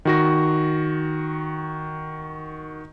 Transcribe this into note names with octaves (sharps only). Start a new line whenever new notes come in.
D#3 F#4 A#6